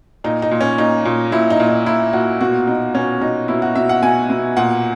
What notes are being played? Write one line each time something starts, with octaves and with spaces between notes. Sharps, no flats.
A#2 D#4
D#4
A#2
C#4
A#2 D#4
A#2
A#2 E4
D#4
A#2
D#4
A#2 E4
A#2 F#4
B2 F#4
B2 D#4
B2 C#4
B2 D#4
B2 E4
F#4
B2 E5
F#5
B2 G#5
B2
A#2 F#5